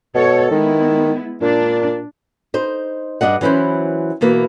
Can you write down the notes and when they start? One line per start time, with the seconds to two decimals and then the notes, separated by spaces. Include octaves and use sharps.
0.15 B2 A4 C#5
0.51 D#3 G#3 B3 E4
1.41 A#2 D4
2.54 D#4 C5
3.21 G2 D4 D#5 F#5
3.41 E3 F#3 C#4 E4 C5
4.21 B2 E3 A#3